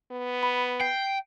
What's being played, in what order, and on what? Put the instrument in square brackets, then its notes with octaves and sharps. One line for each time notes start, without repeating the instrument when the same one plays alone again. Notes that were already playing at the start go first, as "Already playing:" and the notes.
[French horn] B3
[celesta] B5
[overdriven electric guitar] G5 [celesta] C7